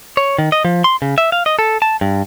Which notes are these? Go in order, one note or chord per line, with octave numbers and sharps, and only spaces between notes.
C#5
D#3
D#5
F3
C6
C#3
E5
F5
D#5
A4
A5
G2